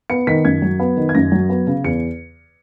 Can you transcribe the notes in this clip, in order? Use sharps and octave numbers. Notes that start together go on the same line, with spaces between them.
B3 C#7
D#3 B6
F#2 G#6
F#3
B3
D#3
G#6
F#2 A#6
F#3
B3
C#3
E2 C#7